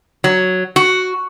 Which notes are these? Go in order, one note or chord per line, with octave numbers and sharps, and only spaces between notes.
F#3
F#4